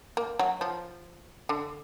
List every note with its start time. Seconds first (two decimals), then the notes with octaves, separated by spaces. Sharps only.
0.17 A#3
0.39 F#3
0.61 F3
1.49 D3